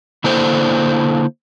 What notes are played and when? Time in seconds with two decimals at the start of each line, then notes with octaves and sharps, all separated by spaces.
0.24 D3 A#3 D4 E4 A4 C5